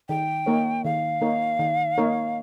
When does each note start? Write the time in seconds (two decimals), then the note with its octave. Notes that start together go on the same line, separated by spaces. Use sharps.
0.09 D#3 G5
0.46 A#3 D#4 A#4 C#5
0.84 D#3 F5
1.21 A#3 D#4 A#4 C#5
1.59 D#3
1.98 A#3 D#4 A#4 C#5